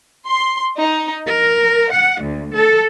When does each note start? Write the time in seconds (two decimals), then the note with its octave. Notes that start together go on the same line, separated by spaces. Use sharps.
0.27 C6
0.78 D#4
1.27 A#4
1.89 F#5
2.22 D2
2.54 A4